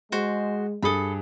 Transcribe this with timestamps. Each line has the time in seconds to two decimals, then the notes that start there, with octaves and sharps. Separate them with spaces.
0.12 G#3 F#4 C5
0.83 G2 G#4 A4 B5 D#6